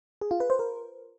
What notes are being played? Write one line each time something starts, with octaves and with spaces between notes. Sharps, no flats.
G#4
F4
B4
C5
A#4